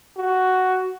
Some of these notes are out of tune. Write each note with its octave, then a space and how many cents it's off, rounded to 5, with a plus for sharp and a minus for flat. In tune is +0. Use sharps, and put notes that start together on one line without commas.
F#4 +5